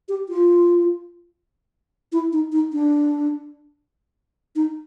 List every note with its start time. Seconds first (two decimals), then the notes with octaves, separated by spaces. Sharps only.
0.09 G4
0.29 F4
2.12 E4
2.33 D#4
2.52 D#4
2.73 D4
4.56 D#4